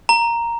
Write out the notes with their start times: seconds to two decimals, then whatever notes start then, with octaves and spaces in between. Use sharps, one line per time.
0.09 A#5